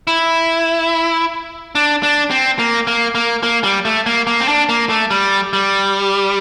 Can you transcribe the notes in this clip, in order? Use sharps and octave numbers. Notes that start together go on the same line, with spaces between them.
E4
D4
D4
C4
A#3
A#3
A#3
A#3
G3
A3
A#3
A#3
C4
D4
A#3
A3
G3
G3